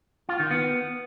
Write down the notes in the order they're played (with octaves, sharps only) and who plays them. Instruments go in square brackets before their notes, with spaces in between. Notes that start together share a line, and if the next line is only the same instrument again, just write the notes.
[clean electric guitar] F4
D#3
B3